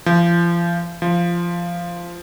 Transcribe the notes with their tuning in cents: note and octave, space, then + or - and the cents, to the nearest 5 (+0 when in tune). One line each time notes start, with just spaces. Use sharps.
F3 -35
F3 -15